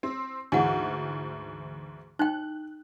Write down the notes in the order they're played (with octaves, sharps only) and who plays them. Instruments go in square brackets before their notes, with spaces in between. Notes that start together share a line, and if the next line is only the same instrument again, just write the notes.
[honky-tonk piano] C4
[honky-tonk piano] D2 G#2 E3 [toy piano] F#5 G#5
[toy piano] D#4 G5 [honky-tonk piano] F#6